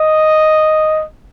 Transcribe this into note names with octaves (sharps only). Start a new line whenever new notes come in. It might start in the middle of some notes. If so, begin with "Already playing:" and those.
Already playing: D#5